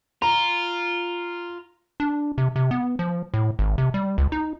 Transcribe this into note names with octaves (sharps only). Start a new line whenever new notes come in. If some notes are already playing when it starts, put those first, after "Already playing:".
F4 A#5
D4
C3
C3
B3
F3
A2
G#1
C3
G3
C#2
D#4